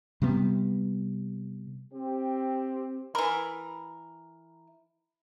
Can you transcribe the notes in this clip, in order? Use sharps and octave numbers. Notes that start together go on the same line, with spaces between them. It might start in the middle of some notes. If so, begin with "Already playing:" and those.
C3 G3 B3
C4 G4
E3 A#4 B5